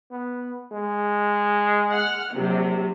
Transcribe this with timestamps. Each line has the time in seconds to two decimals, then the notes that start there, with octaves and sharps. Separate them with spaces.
0.11 B3
0.71 G#3
1.91 F#5 F6
2.33 A#1 C3 F#3